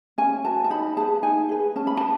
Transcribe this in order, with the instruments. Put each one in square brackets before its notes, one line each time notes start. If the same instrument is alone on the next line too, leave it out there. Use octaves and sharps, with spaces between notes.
[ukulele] C#4 G#5
F#4 B4 A5
A5
D#4 B5
G#4 B4 A5
D#4 G#5
G#4 B4
C#4 A5
B5
B4 A5